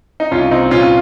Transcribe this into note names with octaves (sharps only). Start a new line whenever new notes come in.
D#4
C2 C#4 F4
C2 C4 D#4
A#2 C#4 F4
F4